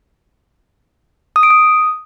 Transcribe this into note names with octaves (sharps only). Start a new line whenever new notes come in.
D#6
D7
D#6